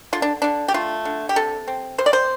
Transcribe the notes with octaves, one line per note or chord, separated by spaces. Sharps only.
D3 F4
D4
D3 D4
G4
A3 F4
D3
G4
C3 A4
C4
C3 C5
D5
C5